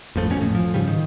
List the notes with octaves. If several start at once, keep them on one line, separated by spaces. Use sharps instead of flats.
A1 F2 F3 A3
G1 E2 B2 C#4
F2 A2
F3
G#2 C#3 F3 G3
D#3